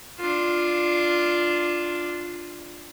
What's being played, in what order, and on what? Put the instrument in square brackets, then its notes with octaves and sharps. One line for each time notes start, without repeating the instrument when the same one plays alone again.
[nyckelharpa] D4 F4